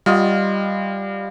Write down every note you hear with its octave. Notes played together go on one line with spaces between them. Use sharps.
G3 F4 D#5 F#5